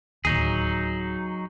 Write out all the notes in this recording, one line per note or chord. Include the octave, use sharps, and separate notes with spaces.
D1 D#2 F#3 D#4 G#4